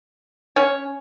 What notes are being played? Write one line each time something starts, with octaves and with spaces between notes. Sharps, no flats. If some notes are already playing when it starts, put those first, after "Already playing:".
C#4 C#5